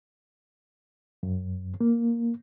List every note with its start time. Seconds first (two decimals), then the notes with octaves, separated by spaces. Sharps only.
1.23 F#2
1.81 A#3